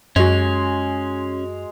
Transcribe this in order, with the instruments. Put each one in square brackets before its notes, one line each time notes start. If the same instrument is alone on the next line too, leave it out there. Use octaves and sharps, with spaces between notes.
[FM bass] F#2 [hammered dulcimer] G#3 [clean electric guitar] C#4 [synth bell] F#4 F7